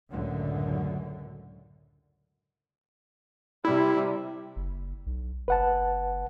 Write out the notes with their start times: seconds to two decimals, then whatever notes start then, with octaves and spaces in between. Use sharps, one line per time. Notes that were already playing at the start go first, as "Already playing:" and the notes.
0.10 C#2 F#2 A2 D3
3.65 C3 G3 E4
4.56 F#1
5.06 B1
5.48 F#1 B4 F#5 A5